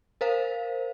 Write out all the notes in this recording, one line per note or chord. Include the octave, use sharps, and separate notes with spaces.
A#4 C5 F5